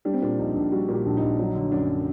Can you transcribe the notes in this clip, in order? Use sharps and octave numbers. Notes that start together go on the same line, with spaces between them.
G3 D4
C4
A#2 D4
A#1 D#4
A#1
G3 F#4
A#2
G4
A#1
A#1 D#4
F#3 D#4
D3
F#2 D4